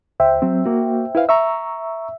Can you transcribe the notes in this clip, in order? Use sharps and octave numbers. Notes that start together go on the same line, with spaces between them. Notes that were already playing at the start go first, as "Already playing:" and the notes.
C#2 C5 E5 G5
F#3 C4
A#3 F#4
E4 B4 F5
E5 A#5 C#6 E6